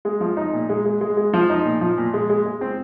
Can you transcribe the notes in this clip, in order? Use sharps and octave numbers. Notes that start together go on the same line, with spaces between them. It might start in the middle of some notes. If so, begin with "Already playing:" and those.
G#3
F3
D#4
A#2
G#3
G#3
G#3
G#3
F3
D#4
A#2
F3
A#2
G#3
G#3
G#3
C4